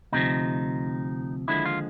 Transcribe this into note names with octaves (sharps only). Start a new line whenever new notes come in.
D2 C3 F3 D#4
D#2 D3 F3 G#3 E4
F4